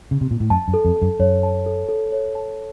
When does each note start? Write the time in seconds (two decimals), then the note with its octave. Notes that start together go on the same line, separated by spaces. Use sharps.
0.11 C#3
0.21 C3
0.31 A#2
0.40 A2
0.50 F#2 A5
0.68 F#2
0.74 A4
0.85 F2
0.96 A4
1.02 F#2
1.19 F#2 C#5
1.43 A5
1.66 A4
1.89 A4
2.12 C#5
2.35 A5